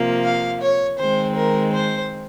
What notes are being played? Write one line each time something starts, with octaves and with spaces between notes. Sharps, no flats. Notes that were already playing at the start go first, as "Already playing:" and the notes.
Already playing: C3 F3 A#3
F5
C#5
D#3 G#3 C4 C5
A#4
C5